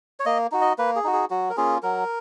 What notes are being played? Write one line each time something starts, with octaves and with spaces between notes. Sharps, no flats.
C#5
A#3 D#5
D#4 F#4
D#5
A#3 B4
G#4
D#4 F#4
G#4
F#3 F#4
A#4
A#3 C#4 F4 G#4
F#3 A#4